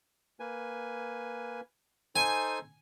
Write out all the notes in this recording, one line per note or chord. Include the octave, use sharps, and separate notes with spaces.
A#3 B4 G#5
D#4 A4 C5 G#5